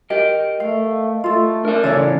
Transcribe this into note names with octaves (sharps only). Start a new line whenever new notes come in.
G4 A#4 D#5
A3 F5
A3 F4 A4
D4 A#4 E5
E2 C#3 A4 C#5 D5